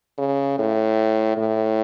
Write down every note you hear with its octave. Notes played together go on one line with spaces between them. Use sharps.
C#3
A2
A2